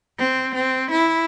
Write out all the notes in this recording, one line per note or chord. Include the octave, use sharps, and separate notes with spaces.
C4
C4
E4